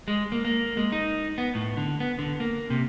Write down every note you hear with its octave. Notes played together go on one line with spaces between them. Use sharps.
G#3
A#3
A#3
G#3
D#4
B3
A2
D3
B3
D3
A#3
C3